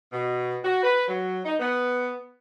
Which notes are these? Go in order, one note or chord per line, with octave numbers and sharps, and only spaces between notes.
B2
F#4
B4
F#3
D#4
B3